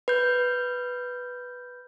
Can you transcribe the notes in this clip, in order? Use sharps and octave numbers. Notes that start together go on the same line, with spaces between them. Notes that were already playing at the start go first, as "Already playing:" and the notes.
B4 G6